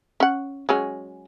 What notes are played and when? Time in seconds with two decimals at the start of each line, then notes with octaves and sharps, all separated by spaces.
0.20 C#4 F#5
0.69 F#3 G#3 C#4